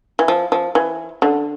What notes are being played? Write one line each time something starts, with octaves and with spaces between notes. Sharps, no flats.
E3
F3
F3
E3
D3